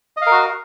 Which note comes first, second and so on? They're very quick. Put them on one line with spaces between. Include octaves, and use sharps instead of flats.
D#5 F5 A#4 F#4